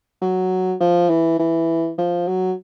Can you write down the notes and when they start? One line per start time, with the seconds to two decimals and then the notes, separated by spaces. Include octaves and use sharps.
0.21 F#3
0.80 F3
1.09 E3
1.39 E3
1.98 F3
2.28 F#3